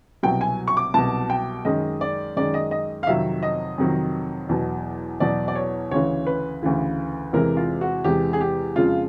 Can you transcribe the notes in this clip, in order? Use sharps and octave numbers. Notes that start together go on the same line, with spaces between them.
C2 B2 F#3 G5
G#5
C#6
D6
C2 B2 F#3 A5
G5
F#2 D#3 G#3 D#5
D5
F#2 D#3 G#3 D5
D#5
D#5
F5
F2 C3 D#3 F#3 E5
D#5
F2 C3 D#3 F#3
E2 B2 F#3
E2 B2 F#3 D5
D5
C#5
D2 C#3 E3 C#5
B4
D2 C#3 E3
E2 C3 E3 G#3 A#4
F4
F#4
E2 C3 E3 G#3 G4
G#4
G4
F2 C#3 F3 G#3 F4